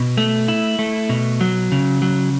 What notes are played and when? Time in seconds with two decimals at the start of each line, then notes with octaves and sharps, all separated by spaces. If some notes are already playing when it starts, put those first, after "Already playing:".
Already playing: B2
0.17 A3
0.48 E4
0.79 A3
1.09 B2
1.41 F#3
1.72 C#3
2.02 F#3